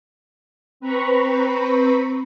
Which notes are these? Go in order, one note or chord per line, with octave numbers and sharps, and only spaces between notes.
C4 B4 A#5 B5 C#6